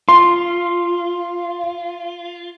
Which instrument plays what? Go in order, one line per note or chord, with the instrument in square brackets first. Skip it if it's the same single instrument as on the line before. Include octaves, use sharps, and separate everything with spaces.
[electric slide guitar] F4 [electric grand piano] C6